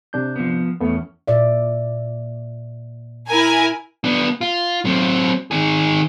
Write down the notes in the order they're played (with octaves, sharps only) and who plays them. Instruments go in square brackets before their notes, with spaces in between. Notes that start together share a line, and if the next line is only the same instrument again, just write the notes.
[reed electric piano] C3 D4 G6
[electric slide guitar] F3 B3
[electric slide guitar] E2 C#4 [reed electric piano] A3 B3
[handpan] A#2 D5 E5
[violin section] E4 A#4 G#5
[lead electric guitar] B3 D4
F4
F#3 C4
D#3 G#4